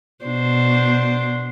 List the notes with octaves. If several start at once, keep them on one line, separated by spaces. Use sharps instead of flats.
B2 D4 C5